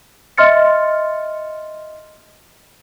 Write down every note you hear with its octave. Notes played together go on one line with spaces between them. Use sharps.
D#5 E5 C6 F6 A6 C#7